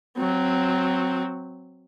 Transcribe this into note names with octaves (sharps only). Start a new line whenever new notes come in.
F#3 C4